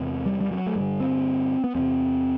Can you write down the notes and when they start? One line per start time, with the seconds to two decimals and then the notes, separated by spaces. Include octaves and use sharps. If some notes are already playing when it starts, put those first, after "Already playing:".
Already playing: E2 C3
0.26 G3
0.41 G3
0.51 F#3
0.67 A3
0.76 G2 D3 G3
1.00 C4
1.64 B3
1.75 E2 C3 C4